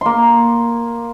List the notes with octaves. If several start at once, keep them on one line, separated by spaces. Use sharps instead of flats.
A#3 C6